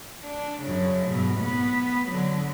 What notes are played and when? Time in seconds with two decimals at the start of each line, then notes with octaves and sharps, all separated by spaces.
0.24 D4
0.63 F#2 C#3
1.08 G#2 B2
1.41 B3
2.09 D3 F#3